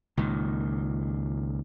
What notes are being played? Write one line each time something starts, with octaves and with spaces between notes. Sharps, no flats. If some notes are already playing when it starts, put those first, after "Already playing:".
C#2 A#2 D#3